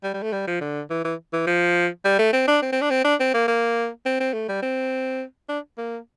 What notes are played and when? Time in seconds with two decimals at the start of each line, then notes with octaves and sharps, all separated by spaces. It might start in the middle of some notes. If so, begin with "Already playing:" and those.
0.03 G3
0.14 G3
0.23 A3
0.33 G3
0.47 F3
0.61 D3
0.90 E3
1.05 E3
1.33 E3
1.47 F3
2.05 G3
2.19 A3
2.33 C4
2.48 D4
2.62 C4
2.72 C4
2.81 D4
2.91 C4
3.05 D4
3.20 C4
3.34 A#3
3.48 A#3
4.06 C4
4.20 C4
4.34 A3
4.49 G3
4.62 C4
5.49 D4
5.78 A#3